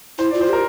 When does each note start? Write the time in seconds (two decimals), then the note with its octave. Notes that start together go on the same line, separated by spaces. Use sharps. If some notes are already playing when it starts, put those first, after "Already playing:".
0.18 E4 C5
0.31 D5
0.34 F4
0.41 C5
0.49 G4 A#4